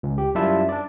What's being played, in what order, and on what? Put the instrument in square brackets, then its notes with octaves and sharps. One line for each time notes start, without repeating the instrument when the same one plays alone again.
[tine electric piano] C#2
G4
F#2 G3 E4 F4 E5 A5
D4 D5